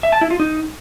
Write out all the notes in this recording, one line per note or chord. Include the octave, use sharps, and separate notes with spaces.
E5
A5
E4
F4
D#4